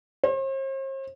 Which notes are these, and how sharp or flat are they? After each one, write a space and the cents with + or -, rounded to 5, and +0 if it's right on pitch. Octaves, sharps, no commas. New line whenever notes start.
C5 +45